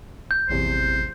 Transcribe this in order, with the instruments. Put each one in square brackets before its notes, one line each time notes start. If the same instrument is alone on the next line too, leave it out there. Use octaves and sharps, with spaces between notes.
[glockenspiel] G6
[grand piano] D#1 E2 C3 [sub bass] A1 [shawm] C5